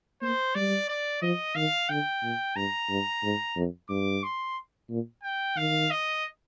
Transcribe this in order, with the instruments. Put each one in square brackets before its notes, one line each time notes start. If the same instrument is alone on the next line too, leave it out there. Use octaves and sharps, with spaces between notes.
[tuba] A#3 [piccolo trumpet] C5
[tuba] G3 [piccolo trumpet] D5
[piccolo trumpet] D5
[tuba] F3 [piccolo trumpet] D#5
[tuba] D#3 [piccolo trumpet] F5
[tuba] D3 [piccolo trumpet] G5
[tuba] A#2
[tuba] G2 [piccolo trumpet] A#5
[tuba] G2
G#2
F2
[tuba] G2 [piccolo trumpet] D6
[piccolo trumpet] C6
[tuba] A#2
[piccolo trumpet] G5
[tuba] D#3 [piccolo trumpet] F5
[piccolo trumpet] D#5